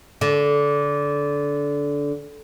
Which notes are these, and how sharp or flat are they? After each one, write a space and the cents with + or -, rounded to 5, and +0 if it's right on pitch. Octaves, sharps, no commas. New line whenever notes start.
D3 -20